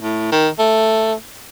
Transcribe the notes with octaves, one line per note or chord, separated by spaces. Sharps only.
A2
D#3
A3